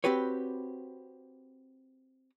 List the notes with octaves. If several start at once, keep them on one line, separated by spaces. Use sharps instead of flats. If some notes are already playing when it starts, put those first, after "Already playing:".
C4 F#4 G4 B4 C#5